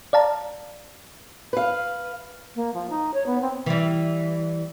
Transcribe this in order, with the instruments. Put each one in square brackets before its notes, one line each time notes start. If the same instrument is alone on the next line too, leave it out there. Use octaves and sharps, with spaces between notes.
[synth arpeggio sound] D5 F5 A5 A#5
[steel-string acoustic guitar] B4 F5
[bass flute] A#3
F3
D#4
C#5
B3
C4
[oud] E3 G3